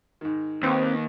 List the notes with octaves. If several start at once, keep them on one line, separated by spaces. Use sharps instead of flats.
G#2 D#3
D#2 C4 B4